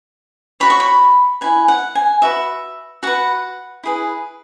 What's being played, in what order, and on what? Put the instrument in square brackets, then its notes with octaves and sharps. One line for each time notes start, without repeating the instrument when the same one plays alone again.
[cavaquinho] F#4 C#5 B5
C#6
B5
E4 B4 G#5
F#5
G#5
F#4 B4 E5
F#4 B4 F#5
E4 G#4 B4